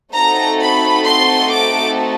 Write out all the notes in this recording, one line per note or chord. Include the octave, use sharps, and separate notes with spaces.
A3 C4 D#4 F#4 A4 A#5
B5
C6
D6